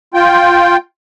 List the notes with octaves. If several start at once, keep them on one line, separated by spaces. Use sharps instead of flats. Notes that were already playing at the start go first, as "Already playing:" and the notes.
F4 G5